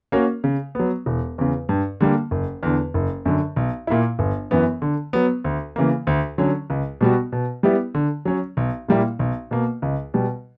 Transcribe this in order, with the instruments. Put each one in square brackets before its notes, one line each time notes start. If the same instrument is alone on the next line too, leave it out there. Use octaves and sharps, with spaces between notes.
[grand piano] A#3 C#4 F#4 A#4
C#3
F#3 B3
E1
E2 C#3
G2
D3 G3 A#3
F#1
E2 D3
F#1
F#2 D3
B1
A#2 A#3 E4
G1
F#2 E3 B3
D3
F#3 B3
D2
C#3 E3 A#3
D2
D3 F#3 C#4
C#2
B2 G3 B3 F#4
B2
G3 B3 E4 G4
D3
F#3 C#4
B1
A#2 G3 A#3 E4
B1
B2 A#3
C#2
B2 G3